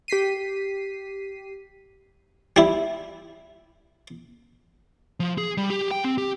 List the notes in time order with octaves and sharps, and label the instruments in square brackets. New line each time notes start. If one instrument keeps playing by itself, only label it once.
[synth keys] G4 B6 C7 D#7
[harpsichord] G3 E4
[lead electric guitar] F3
G#4
G3
G4
G5
C4
G4